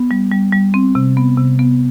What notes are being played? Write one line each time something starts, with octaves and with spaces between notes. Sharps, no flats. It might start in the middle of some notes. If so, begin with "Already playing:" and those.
Already playing: B3
G3
G3
G3
C4
C3
B3
C3
B3